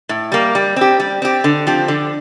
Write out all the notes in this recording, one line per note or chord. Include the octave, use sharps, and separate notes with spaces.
A2
G3 A#3
G3
C4 G4
G3
C4 G4
D3
F3 C4 G4
D3